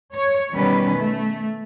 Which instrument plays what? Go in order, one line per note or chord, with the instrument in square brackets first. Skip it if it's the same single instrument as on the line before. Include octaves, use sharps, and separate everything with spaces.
[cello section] C#5
B2 D#3 G3 C#4 B4
A3